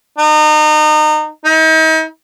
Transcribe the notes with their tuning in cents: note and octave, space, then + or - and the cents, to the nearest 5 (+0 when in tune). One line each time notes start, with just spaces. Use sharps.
D#4 -30
D#4 +40